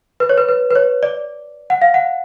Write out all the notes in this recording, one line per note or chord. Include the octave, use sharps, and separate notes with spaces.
B4
C#5
B4
B4
B4
C#5
D5
F#5
F5
F#5